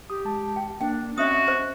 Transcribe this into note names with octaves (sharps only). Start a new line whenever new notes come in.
G4 D#6
G#3 A5
G5
A#3 D4 G5
C4 C#4 F#4 D#5 E5 D#6
C5 D#5